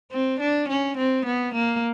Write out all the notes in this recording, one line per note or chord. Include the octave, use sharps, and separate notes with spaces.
C4
D4
C#4
C4
B3
A#3